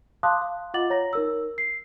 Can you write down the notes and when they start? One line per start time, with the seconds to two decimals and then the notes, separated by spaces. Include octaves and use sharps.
0.23 F5 A5 C6 D6 D#6 F#6
0.42 F5
0.74 F4 D#5 F#5 D6 A6 F#7
0.90 C#5 A#5 A#6
1.13 D#4 A#4 E6
1.58 C7